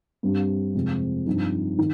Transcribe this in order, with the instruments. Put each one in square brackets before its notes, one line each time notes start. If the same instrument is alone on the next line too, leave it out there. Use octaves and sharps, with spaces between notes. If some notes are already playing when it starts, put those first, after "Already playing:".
[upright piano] G2 G3 C4
F2 C3 F3 G#3 C4
G2 F3 C4 D#4
D#3